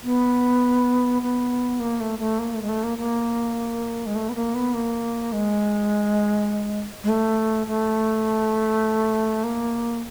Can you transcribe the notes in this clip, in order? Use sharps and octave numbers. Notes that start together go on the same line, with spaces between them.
B3
B3
A#3
A3
A3
A#3
A3
G#3
A3
A#3
A#3
G#3
A3
B3
A#3
B3
A#3
G#3
G#3
A3
A3
A#3